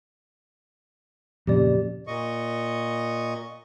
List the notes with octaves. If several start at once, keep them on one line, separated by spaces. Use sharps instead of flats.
F2 A#2 C#3 G4 D5
A#2 D#5 C#6